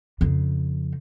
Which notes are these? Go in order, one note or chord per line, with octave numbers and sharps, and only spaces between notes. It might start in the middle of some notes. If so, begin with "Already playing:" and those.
F2 C#3